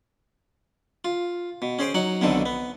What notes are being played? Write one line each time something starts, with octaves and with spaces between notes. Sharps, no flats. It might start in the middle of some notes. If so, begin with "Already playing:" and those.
F4
B2
C#4 G#4 C5 G5
F#3 D#4 F#5
B1 B2 D3 D#3 C4 A4
B3